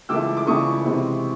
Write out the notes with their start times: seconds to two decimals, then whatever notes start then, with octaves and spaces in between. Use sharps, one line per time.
0.09 C#2 C#3 E3 A3 D6 E6
0.37 D6
0.47 C#2 C#3 E3 A3 C#6 D#6
0.84 C3 E3 G#3 C4